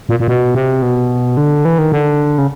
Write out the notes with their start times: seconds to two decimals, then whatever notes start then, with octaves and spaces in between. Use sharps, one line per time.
0.09 A#2
0.20 A#2
0.28 B2
0.55 C3
0.82 B2
1.37 D3
1.65 E3
1.78 D#3
1.92 D3
2.38 C#3